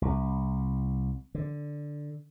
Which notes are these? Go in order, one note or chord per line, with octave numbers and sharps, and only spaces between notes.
C2
D3